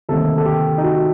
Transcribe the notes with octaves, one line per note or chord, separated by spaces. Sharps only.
D2 C3 D#3 G3 A#3 A4
A4
G4
D#4
F#4